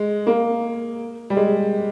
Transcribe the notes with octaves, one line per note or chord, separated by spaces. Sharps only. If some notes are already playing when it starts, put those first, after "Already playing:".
Already playing: G#3
A#3
G3
G#3